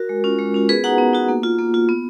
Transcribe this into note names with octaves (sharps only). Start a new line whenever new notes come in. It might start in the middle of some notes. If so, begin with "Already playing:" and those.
Already playing: F#4 A#4
G#3
C#4 F4
G#3
C#4 F4
B3 G#4 B4
D#4 F#4 F#5 A#5
B3
D#4 F#4
A#3
F4
A#3
F4
B3